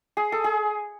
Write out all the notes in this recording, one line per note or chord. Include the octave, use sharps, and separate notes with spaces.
G#4
A4
G#4